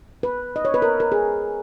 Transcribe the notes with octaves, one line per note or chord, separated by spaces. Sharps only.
B4
D#5
C#5
B4
A#4
A#4
G#4